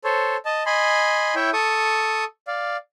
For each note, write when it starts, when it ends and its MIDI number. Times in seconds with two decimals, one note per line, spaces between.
0.04 0.37 69
0.04 0.37 72
0.04 0.37 73
0.45 0.63 75
0.45 0.63 81
0.66 1.35 75
0.66 1.35 80
0.66 1.35 83
0.66 1.35 84
1.35 1.50 64
1.35 1.50 73
1.35 1.50 76
1.35 1.50 79
1.53 2.24 69
1.53 2.24 85
1.53 2.24 87
2.47 2.77 74
2.47 2.77 77